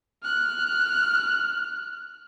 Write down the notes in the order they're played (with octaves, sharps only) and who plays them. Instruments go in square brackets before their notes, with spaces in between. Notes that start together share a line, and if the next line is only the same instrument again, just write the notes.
[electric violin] F6 F#6